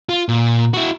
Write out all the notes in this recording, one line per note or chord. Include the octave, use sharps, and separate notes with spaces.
F4
A#2
E4 F#4